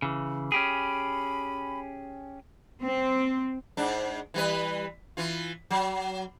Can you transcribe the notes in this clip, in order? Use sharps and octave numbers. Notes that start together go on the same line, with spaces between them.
C#3 E3
C#4 G4 G#4 B5
C4
G#2 D4
E3 G3 B4
E3 F4
F#3